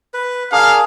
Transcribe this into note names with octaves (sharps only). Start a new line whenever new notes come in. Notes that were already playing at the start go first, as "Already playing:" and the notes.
B4
D4 G#4 A#4 F5